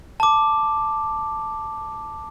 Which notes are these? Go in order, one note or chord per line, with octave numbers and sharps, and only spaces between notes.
A5 D6